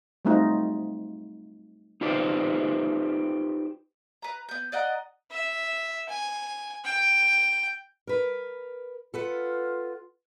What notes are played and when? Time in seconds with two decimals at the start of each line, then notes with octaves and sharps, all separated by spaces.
0.25 F#3 G3 A3 C4 D#4 F4
2.01 D#4 F4 G4 B4 C5 D5
4.22 B4 A#5
4.49 B3 G6
4.72 D5 D#5 F#5 A#5
5.31 E5
6.09 G#5
6.85 G5
8.07 A#4 B4
9.14 F4 A4 B4 F#5